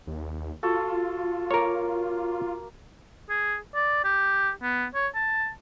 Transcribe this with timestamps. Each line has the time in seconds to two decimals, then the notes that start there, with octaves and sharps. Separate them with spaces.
0.07 D#2
0.63 F4 F#4 A4
1.51 A#3 A#4 C#5 D6
3.30 G#4
3.75 D5
4.04 G4
4.62 B3
4.95 C#5
5.15 A5